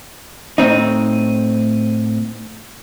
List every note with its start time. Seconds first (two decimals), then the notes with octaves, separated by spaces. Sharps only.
0.58 A2 C4 D#4